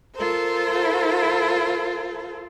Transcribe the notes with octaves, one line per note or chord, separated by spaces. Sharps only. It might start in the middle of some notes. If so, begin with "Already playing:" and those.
F4 A4 A#4 C5